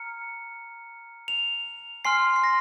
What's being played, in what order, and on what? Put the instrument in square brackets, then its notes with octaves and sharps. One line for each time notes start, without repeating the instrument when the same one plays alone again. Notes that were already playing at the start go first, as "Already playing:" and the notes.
Already playing: [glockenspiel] A#5 F6 C#7
F7
G#5 C6 F6 C7
C7
A#6